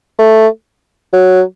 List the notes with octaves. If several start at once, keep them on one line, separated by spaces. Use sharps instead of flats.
A3
F#3